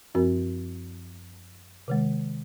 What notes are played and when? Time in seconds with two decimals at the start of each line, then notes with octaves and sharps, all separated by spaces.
0.15 F#2 F3 C4 F#4 A#4
1.88 C3 D#3 G#3